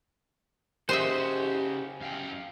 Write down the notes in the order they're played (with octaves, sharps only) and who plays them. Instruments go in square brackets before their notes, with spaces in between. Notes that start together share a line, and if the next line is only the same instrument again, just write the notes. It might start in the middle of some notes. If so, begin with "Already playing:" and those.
[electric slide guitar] C#3 F#4 [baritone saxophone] G4 [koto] C5 D#5 E5
[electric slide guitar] F#2 F5 G5